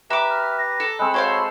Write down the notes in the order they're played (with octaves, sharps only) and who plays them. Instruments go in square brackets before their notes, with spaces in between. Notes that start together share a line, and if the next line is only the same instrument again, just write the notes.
[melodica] G4 B4 [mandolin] E5 D6 [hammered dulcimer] A#5
[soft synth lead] F6
A#6
[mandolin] A4
[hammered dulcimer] G#3 C4 [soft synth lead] B5
[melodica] F#4 C#5 C6 [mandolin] A4 C5 F5